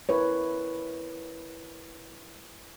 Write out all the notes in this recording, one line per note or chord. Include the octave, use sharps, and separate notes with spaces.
E4 A#4 B4 C#5